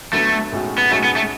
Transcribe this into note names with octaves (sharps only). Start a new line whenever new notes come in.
D2 D3 F#3 A3 B3
B1 A2 G#3 C#4 F#4
B3
B1 A2 G#3 A3 C#4 F#4
B3
A3